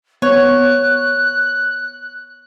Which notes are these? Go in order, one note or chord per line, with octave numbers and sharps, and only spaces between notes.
B3 C#5 F#6